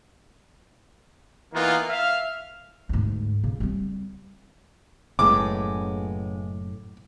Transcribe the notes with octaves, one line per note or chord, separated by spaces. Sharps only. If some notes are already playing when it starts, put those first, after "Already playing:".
E3 A#3 B3 D#4 F4
E5 F5
D2 G#2
C#3
G3 C4
F#1 A2 C#3 G#3 B3 D6